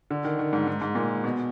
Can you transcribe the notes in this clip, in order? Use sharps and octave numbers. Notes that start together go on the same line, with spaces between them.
D3
D#3
D#3
G#2
G#2
G#2
A#2
B2